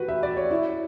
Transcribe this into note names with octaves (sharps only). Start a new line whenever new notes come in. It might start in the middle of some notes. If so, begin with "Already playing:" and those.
Already playing: F#4 G4 B4
E5
D5
C#5
E4